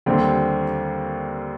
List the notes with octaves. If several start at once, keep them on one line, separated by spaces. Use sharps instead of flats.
D#2 D3 G3 C4